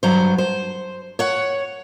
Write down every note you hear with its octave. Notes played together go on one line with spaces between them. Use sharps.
G2 F#3 C5
C5
C#5 F#5